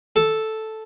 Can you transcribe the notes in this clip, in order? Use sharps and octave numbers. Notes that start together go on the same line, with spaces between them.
A4